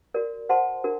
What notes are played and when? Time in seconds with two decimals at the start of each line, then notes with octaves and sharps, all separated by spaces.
0.14 F#4 A#4 D5
0.49 F#4 C5 F#5 A5 C6
0.84 D4 F#4 A#4